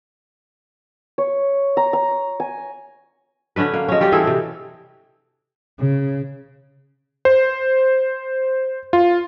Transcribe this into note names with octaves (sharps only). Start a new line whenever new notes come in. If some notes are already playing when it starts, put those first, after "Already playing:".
C#5
A#5
A#5
G#5
D3 C#4 D4 B4
A#3
G#3 C#4
G3 C#4 G4 D5
E3 C4 G#4 A4
C3 D4
C#3
C5
F4